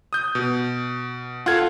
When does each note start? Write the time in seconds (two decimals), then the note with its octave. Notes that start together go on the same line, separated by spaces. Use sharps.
0.13 D#6 G6
0.35 B2
1.46 F4 A4 F#5 G#6